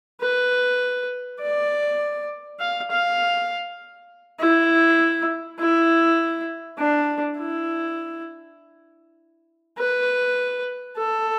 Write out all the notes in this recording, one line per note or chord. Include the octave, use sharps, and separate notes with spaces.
B4
D5
F5
F5
E4
E4
D4
E4
B4
A4